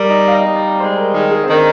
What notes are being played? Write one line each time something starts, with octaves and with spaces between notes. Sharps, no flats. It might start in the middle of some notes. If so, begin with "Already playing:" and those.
Already playing: G3 A#4
D#4
F5
D#5
G3
D5
G#3 C5
A#4
D#3 G#4
G#4
C4
D#3 D4